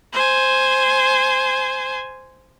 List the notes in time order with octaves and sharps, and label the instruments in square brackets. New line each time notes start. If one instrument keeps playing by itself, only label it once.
[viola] C5 G#5